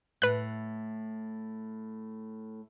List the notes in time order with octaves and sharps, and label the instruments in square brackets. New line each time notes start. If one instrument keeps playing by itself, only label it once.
[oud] A2 [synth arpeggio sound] B4 F#6